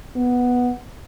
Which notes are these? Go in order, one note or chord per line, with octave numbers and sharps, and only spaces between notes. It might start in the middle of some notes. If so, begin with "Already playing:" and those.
B3